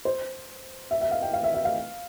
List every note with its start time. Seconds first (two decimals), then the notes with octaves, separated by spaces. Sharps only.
0.05 C5
0.91 E5
1.01 E5
1.11 F5
1.22 G5
1.33 F5
1.44 E5
1.54 E5
1.65 F5